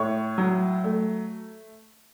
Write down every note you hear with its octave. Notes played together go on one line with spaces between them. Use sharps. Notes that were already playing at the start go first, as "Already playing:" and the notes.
Already playing: A2 C#5 C#6
F#3
A3